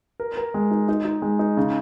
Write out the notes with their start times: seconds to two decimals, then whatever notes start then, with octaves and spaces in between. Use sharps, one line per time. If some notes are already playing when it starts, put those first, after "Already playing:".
0.20 A#4
0.37 A#4
0.54 G#3
0.71 D#4
0.88 D#4
1.05 D#4
1.22 G#3
1.39 D#4
1.57 C#3